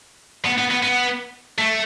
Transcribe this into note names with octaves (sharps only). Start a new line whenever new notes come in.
B3
B3
B3
B3
A3